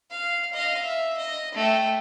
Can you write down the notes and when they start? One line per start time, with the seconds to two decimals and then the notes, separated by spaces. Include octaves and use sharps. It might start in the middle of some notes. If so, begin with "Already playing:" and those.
0.11 F5
0.53 D#5 F5
0.82 E5
1.17 D#5
1.55 A3 G5